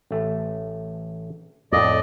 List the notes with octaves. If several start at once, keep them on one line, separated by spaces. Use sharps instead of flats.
A1 A3
F2 A2 D5 D#5